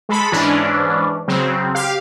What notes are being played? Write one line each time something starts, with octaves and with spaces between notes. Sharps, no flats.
G#3 A4 B5
G#2 E3 C#4 D4
C#3 F#3 C4
G4 F5